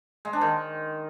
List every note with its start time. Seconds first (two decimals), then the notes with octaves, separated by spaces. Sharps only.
0.25 G#3
0.33 D4
0.41 D#3